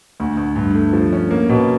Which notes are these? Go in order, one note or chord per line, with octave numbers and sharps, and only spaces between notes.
D2
D2
G2
A3
F3
C#4
A#3
B2